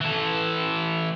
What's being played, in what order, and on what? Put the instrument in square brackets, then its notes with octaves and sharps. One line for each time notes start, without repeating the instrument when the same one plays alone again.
[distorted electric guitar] E3 A4